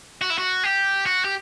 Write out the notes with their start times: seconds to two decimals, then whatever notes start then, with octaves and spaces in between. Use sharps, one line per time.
0.21 F#4
0.30 E4
0.38 F#4
0.64 G4
1.06 F#4
1.25 G4